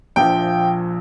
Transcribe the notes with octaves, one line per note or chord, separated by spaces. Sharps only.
A#1 A#2 F3 G5